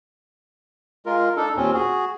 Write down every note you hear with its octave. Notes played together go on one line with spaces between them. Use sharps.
G#3 F4 A#4
D4 D#4 A4
D#2 A#2 C4 C#4
F#4 G#4